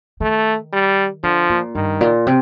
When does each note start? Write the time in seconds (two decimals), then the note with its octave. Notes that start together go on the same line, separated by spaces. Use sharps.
0.20 D#3 A3
0.73 G3
1.23 D3 F3
1.50 A#2
1.75 G2 D#3
2.01 A#2
2.27 C3